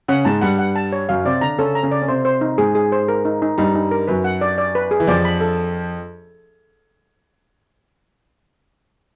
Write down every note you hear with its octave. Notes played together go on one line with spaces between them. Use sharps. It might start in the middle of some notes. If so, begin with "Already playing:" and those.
C#3 C#4 F#5
G#2 G#3 A5
G2 G3 F#5
F#5
A5
C#5
F#2 F#3 F5
C3 C4 D5
D3 D4 A#5
C#3 C#4 A4
A#5
C#3 C#4
D5
C#4
C3 C4 C5
C5
D#4
G#2 G#3 G#4
G#4
C5
A#4
D#4
D#4
G2 G3 D#4
D#4
A#4
F#2 F#3 B4
F#5
D5
D5
B4
G#4
E3
F2 F3 D5
B5
A4